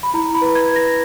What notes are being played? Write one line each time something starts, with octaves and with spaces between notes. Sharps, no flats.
B5
E4 A#5
B5
B4
G#6
B4
A#6